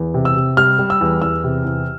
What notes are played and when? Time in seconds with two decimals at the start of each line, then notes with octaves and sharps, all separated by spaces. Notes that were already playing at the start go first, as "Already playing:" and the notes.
Already playing: E2
0.14 C3
0.25 E6
0.36 C3
0.57 G3 F6
0.79 G3
0.90 E6
1.01 E2
1.22 E2 E6
1.44 C3
1.65 E2